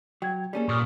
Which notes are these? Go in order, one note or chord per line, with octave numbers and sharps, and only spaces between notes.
F#3 G5 G#6
G3 A#3 C#4 G#4 A4
A#2 C#6 D#6 F6